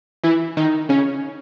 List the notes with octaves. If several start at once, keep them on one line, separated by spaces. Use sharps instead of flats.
E3 E4
D#3 D#4
C#3 C#4